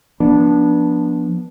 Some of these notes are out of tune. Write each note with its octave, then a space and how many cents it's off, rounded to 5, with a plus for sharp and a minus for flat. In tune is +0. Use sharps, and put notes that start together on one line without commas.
F3 +0 B3 -30 D4 -5